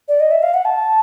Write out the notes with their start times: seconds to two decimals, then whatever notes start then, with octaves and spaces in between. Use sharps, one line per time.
0.08 D5
0.20 D#5
0.31 E5
0.43 F5
0.54 F#5
0.65 A5